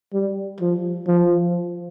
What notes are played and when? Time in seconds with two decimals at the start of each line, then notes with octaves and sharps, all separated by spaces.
0.13 G3
0.61 F3
1.07 F3